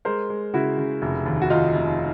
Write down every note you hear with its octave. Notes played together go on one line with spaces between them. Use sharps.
G#3 A#4 C5
G#3
C#3 E4 F#4
C#3
F1
D#2
F#4
D#2 D#4 F4
F1